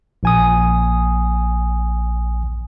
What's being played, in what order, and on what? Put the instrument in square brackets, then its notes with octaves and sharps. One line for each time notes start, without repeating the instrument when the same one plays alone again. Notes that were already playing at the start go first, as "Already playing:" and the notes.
[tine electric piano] A#1 G#5 D#6